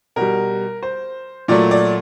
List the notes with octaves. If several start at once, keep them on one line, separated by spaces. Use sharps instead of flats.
B2 G3 A#4
C5
A#2 F#3 A3 D5
D5